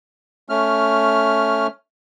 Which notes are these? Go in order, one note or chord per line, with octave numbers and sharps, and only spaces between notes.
A3 C#4 F6